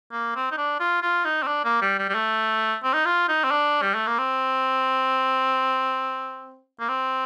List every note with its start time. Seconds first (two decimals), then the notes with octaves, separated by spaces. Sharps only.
0.12 A#3
0.36 C4
0.52 D#4
0.57 D4
0.80 F4
1.02 F4
1.25 D#4
1.43 C4
1.47 D4
1.65 A#3
1.81 G3
1.99 G3
2.09 G3
2.15 A3
2.84 C4
2.94 D#4
3.05 F4
3.28 D#4
3.44 C4
3.51 D4
3.82 G3
3.95 A3
4.07 A#3
4.19 C4
6.80 A#3
6.89 C4